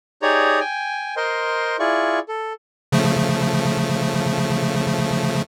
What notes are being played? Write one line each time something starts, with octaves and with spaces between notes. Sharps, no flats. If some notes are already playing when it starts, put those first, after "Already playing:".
D#4 G4 G#4 C#5 D5 A#5
G5 G#5
A#4 C5 D#5 C6
E4 F4 G#4 D5 C#6
A4
C#3 F3 A3